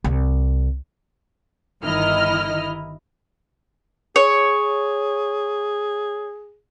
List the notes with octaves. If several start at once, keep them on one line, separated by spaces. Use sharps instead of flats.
C2
G1 D#3 E4 D#5 F6
G#4 C#5